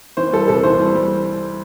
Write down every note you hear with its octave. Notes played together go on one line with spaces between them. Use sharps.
E3 C5
G3 A4
C2 A4
E3 C5
G3
G3